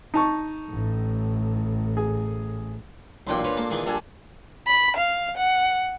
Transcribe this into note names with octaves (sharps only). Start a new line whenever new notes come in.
D#4 A5 C#6
A1 A2
G#4
B1 A#2 E3 D4 G5 C6
C#4 B4
A#3 A4
D#3 E3 G#4
A#1 G3 D4 A4 G#5
B5
F5
F#5